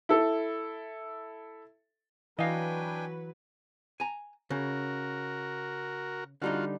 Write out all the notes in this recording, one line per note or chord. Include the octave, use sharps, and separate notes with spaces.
E4 A4
E3 F#3 D4 B4 D#5 F5 G5 G#5
G#5 A#5
C#3 F#4 A#4
D3 G3 D#4 F4 F#4